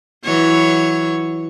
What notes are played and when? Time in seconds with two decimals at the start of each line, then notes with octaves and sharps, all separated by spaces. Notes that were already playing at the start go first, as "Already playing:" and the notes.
0.24 E3 F#3 C#5